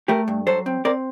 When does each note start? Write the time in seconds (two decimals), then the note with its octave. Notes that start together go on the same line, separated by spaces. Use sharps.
0.08 A3 G4 A#4
0.28 G2
0.47 F#3 A4 C5
0.66 C4
0.85 C4 A#4 D5